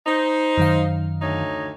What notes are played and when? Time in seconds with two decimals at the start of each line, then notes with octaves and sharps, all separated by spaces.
0.07 D#4 C5
0.57 F#2 D#3 F5
1.21 D2 D#4 C#5